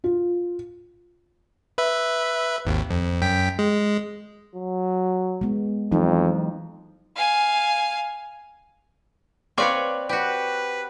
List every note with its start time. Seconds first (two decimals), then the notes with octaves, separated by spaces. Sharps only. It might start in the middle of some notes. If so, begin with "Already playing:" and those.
0.04 F4
1.78 B4 E5
2.65 G#1 D#2
2.90 F2
3.22 F#2 G5 B6
3.59 G#3
4.55 F#3
5.41 G#3 B3
5.92 F2 E3 F#3 D#4
7.16 F5 G#5
9.58 C4 B4 C#5 D5 F5 C#6
10.09 F#4 G4 B4